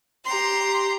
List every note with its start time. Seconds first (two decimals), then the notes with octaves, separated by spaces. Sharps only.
0.25 G4 A#5 C6